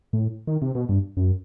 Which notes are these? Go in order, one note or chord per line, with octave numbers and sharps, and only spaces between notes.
A2
D#3
C3
B2
G2
F#2